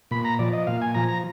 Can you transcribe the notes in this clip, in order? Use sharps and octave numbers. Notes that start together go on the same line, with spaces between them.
A#2 B5
A#5
F3 D5
D#5
A#2 F5
G#5
F3 A#5
A#5